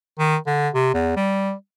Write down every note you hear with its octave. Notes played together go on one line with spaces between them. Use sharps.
D#3
D3
C3
E2
G3